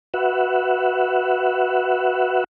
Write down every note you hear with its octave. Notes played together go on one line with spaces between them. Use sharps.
F#4 B4 E5 F#5